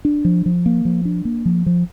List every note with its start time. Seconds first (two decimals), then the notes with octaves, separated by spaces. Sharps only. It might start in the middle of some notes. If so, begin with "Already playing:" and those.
0.05 D4
0.25 F3
0.46 F3
0.66 A#3
0.85 F3
1.05 D4
1.25 A#3
1.45 F3
1.66 F3